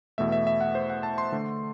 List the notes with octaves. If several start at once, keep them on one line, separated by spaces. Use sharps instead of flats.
E2 B2 A3 E5
E5
E5
F#5
C5
F#5
A5
C6
D3 A3 D4